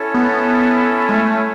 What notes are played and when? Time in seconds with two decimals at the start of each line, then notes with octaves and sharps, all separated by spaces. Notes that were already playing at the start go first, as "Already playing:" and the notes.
Already playing: C#4 E4 A4 C#5
0.14 B3
1.09 G#3
1.14 A3